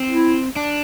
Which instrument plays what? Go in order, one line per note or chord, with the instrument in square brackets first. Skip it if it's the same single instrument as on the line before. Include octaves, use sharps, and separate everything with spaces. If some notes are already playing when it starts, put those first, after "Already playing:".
Already playing: [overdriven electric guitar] C4
[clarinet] E4
[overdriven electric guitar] D4